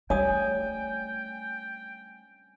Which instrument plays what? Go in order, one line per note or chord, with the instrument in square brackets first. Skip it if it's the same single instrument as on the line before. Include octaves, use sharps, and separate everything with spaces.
[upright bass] G3 A3 [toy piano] C#5 D#6 [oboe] G5 [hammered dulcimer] G#5